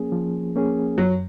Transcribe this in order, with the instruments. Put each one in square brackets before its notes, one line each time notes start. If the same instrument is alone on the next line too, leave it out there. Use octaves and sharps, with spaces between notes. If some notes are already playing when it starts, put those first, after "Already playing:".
Already playing: [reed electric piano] F3 A#3 C#4 G#4
F3
A#3 C#4 G#4
[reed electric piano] F#2 [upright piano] F#3